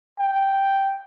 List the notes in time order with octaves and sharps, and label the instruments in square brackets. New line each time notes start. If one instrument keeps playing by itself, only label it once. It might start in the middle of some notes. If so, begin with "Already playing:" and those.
[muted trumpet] G5